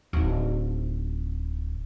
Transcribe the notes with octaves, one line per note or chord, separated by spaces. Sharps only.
D1 D#4